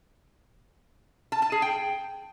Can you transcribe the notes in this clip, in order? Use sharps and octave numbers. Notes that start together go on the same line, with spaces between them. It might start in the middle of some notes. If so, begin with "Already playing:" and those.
A5
A5
G#4
G5